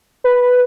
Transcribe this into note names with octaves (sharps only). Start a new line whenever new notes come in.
B4